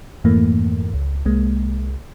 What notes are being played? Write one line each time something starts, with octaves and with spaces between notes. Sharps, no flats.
F2 G#2 E3 A3 A#3
C#2
C2 G#3 A#3